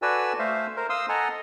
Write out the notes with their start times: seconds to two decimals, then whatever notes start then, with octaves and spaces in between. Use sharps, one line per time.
0.02 F#4 A4 B4 D5 G#5 E6
0.39 A3 C5 E5 F5
0.76 A#4 C5
0.90 F5 C6 D#6 E6
1.09 A4 D#5 F#5 G#5 A#5